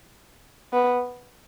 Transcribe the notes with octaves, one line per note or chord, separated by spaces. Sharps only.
B3